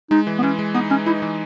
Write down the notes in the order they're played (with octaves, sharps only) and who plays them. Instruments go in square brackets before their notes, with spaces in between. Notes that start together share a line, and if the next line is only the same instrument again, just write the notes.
[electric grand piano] G#3 [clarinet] D#4
[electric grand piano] E3
[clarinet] B3
[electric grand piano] E3 [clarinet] C#4
[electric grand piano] G#3
[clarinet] B3 [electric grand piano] D#4
[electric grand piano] G#3 [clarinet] C#4
[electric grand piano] D#4 [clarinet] E4
[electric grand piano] E3